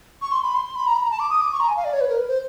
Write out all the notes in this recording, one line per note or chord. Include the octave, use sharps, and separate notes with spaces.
C#6
C6
B5
C6
C6
B5
A#5
B5
A#5
A5
D6
D#6
D6
C#6
A#5
G#5
F5
D5
C#5
B4
A#4
B4
C5